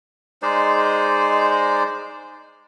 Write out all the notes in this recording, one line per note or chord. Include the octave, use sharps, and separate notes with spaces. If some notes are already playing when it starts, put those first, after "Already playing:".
G#3 D#4 C5 D5